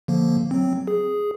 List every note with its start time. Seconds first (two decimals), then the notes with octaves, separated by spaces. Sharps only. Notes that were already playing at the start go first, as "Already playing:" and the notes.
0.08 D3 F3 A#3
0.51 F#3 C4
0.88 G#4